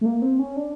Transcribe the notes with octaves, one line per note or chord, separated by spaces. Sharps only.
A3
A#3
C4
C#4
D4